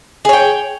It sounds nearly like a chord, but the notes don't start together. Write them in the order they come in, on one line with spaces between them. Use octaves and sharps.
G#4 C#5 G5